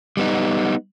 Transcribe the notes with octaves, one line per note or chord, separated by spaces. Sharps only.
G3 B3 D#4